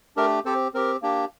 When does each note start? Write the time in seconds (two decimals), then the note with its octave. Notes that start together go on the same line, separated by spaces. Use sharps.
0.16 A3 D4 G4 A#4
0.45 C4 G4 A4 C5
0.74 C4 G4 A#4
1.02 A#3 D4 G4